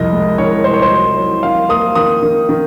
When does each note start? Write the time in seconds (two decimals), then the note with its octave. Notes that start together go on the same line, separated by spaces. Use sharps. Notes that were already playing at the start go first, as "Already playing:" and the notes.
Already playing: C2 F2 D#5
0.12 G#3
0.38 D#3 C#5
0.64 C2 C5
0.74 C#5
0.82 C5
0.91 F#3
1.17 F#3
1.43 D#3 F5
1.69 A#3 D#6
1.95 D#3 D#6
2.23 D#3
2.49 D#3